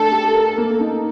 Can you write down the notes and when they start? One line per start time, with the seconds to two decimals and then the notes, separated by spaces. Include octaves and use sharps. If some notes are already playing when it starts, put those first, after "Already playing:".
Already playing: A3 D4 A4
0.12 G4
0.35 A#4
0.58 A#3
0.80 D#4